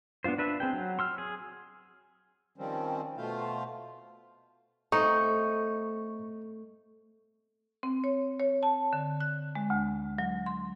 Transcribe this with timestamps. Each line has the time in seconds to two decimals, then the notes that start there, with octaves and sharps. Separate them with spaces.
0.24 B3 D4 D#4 F4 C5
0.38 D4 B4 E5
0.60 C4 G#4 G5
0.73 F#3
0.99 C6 E6 F6
1.18 G#4
2.58 D#3 F3 G3 C4 C#4
3.17 B2 A3 F4 C5 F5
4.92 A3 B3 C4 D#4 C#6
7.83 C4
8.04 C#5
8.40 C#5
8.63 A5
8.93 D3
9.20 F#6
9.55 G#3
9.70 D2
10.18 F#3
10.46 C6